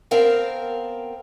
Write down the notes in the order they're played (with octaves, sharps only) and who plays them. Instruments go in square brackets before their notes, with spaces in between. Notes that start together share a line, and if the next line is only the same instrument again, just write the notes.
[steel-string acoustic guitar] B3 C4 A#4 F5 G5 A5